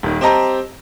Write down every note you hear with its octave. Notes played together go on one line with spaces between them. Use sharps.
D#1 D#3
C4 G4 D#5 A5 A#5